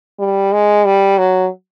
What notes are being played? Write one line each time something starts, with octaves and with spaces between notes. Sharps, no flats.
G3
G#3
G3
F#3